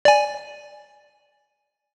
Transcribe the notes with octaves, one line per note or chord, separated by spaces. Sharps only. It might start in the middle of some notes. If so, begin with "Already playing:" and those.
D5 G#5